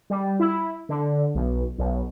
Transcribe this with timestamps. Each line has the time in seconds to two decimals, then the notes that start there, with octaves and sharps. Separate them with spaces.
0.10 G3
0.40 E4
0.89 D3
1.35 B1
1.79 B1